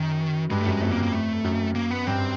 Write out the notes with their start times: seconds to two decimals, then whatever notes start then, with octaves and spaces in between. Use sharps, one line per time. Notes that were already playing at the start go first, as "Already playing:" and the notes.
Already playing: F#2 D#3
0.50 G2 G#3
0.61 A3
0.66 F#2 G#3
0.82 F2 A3
0.92 A#3
1.02 A#3
1.13 A3
1.44 F#2
1.75 A#3
1.91 B3
2.07 G2 C4